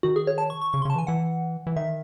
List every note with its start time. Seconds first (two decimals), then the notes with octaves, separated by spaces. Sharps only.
0.03 D#3 F#4
0.16 G#4
0.27 C#5
0.38 A5
0.50 C#6
0.62 C#6
0.73 C#3 C#6
0.82 C6
0.85 C#3
0.90 A5
0.96 E3 G#5
1.07 E3 F#5
1.67 E3
1.76 D#3 E5